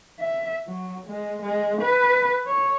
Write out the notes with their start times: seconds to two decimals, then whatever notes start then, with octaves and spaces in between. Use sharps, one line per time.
0.20 E5
0.68 F#3
1.07 G#3
1.42 G#3
1.81 B4
2.46 C#5